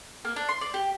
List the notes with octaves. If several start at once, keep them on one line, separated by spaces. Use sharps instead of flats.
A#3
D4
C6
D5
G4